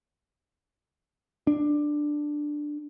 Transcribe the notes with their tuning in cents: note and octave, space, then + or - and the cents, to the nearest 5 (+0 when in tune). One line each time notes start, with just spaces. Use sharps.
D4 +10